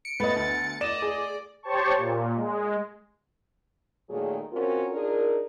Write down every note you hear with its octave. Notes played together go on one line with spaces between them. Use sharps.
C#7 D7
A3 B3 B4 D#5 A6
D2 A6
D5 D#5 E7
G#4
G4 C5 C#5 A5 C#6
A#2
G#3
A#2 D#3 F#3 A3 G#4
C4 C#4 F4 F#4 A#4
D4 D#4 F4 G#4 A#4